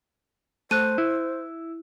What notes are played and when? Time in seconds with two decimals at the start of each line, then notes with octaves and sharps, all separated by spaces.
0.71 A3 C5 F#6 D#7
0.98 E4